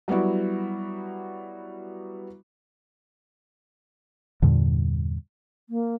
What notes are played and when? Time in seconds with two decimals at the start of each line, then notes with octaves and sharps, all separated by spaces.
0.08 F#3 G3 B3 E4 F#4
4.42 E2 G2 A#2 D3
5.69 A#3